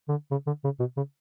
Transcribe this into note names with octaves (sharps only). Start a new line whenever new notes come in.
D3
C#3
D3
C#3
B2
C#3